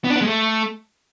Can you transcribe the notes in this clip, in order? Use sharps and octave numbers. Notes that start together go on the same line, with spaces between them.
B3
D4
B3
G#3
A3